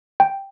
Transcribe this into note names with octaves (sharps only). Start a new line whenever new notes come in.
G5